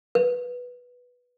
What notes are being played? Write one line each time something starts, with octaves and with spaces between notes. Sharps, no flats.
B4